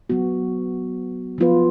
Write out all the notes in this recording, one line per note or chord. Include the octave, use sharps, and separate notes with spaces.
F#3 B3 F#4
F3 B3 F4 B4